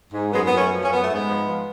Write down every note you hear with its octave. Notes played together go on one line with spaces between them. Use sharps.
G#2
F#2 G#3 B3
F#2 B3
A3 C#4
F3
C#4
F#2 B3
G#2 A3
G#3 B3
F3
F3